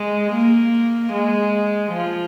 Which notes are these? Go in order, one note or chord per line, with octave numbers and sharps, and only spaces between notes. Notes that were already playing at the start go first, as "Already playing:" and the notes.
Already playing: G#3
A#3
G#3
F3